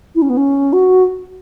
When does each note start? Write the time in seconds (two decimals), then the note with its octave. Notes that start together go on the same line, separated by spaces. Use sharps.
0.15 E4
0.22 C#4
0.29 B3
0.37 C#4
0.73 F#4